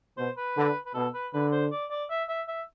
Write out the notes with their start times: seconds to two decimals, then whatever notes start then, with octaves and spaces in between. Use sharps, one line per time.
0.17 B2 C5
0.37 B4
0.57 D3
0.86 B4
0.94 B2 A4
1.14 B4
1.33 D3 B4
1.52 C5
1.72 D5
1.91 D5
2.10 E5
2.28 E5
2.48 E5